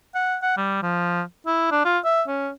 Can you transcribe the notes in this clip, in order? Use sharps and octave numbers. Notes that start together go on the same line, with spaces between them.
F#5
F#5
G3
F3
E4
D4
F4
E5
C#4